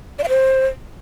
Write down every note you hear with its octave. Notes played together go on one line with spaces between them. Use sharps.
D5
F5
C5